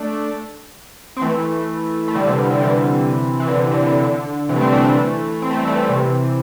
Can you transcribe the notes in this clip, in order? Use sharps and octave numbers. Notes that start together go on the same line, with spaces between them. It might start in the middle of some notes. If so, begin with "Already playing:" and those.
Already playing: A3 D4
C4
E3 A3
A3
D3 G3
C3 E3
C3
D3
G3
C3 E3
E3
D3
C3
D3
D3
D3
C3 E3
A3
G3 C4
A3 D4
E3 A3
C4
A3
G3
E3 A3
G3
C3 E3